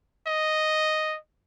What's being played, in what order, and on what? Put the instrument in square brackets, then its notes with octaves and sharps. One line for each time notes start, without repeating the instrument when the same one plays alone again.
[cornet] D#5